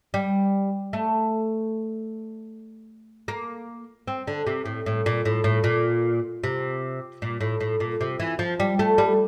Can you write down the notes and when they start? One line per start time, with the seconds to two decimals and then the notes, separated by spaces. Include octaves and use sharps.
0.14 G3
0.93 A3
3.28 A#3
4.08 C4
4.27 D3
4.47 C3
4.66 A2
4.86 A2
5.06 A#2
5.25 A2
5.44 A2
5.64 A#2
6.44 C3
7.22 A#2
7.41 A2
7.60 A2
7.80 A#2
8.01 C3
8.20 E3
8.39 F3
8.60 G3
8.79 A3
8.98 G3